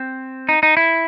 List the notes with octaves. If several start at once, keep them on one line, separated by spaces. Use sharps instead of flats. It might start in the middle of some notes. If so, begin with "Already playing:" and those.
Already playing: C4
D#4
D#4
E4